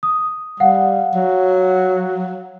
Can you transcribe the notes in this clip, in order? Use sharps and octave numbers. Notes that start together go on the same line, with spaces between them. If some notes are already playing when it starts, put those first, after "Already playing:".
D#6
G3 F5 F#5
F#3